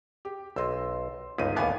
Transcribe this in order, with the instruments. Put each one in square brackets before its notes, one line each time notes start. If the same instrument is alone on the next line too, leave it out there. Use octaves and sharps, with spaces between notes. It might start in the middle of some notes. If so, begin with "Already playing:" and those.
[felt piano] G4
[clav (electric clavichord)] B1 D#5 [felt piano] C6 E6
[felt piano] G1 D#4 D#7 [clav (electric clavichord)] C#2
[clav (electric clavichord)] D#2 A2 B3 [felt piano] F5 G#5 D6